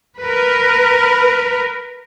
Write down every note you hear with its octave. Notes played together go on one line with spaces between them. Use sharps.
A#4 B4